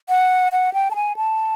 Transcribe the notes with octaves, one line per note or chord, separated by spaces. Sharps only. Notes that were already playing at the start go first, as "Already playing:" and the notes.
F#5
F#5
G5
A5
G#5
A5